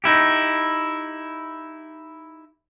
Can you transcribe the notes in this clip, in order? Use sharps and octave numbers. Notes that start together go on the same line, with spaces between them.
D#4 E4 G4